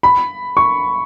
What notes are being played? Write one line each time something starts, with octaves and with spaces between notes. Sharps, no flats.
B5
C#6